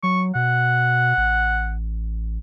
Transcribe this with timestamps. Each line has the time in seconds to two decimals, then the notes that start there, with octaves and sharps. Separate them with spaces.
0.03 F#3 C#6
0.35 B2 F#5
1.17 A1